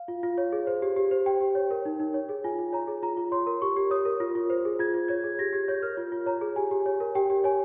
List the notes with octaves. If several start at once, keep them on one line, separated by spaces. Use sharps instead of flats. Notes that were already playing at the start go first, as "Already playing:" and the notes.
Already playing: F5
F4
F4
C#5
G#4
C5
G4
G4
C5
G4 G5
G4
C#5
A#4
D#4
D#4
C#5
G#4
F4 G#5
F4
C#5 A#5
G#4
F4 A#5
F4
C#5 C6
A#4
G4 C#6
G4
C#5 D#6
A#4
F4
F4
C5
G#4
F4 G#6
F4
C#5 G#6
G#4
G4 A#6
G4 G#6
C#5 G6
A#4 F6
F4
F4
C#5 A#5
G#4
G4 G#5
G4
C#5
A#4
G4 G5
G4
C#5 G#5